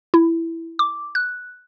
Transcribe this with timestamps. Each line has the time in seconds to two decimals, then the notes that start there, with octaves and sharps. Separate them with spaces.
0.14 E4
0.79 D6
1.15 F#6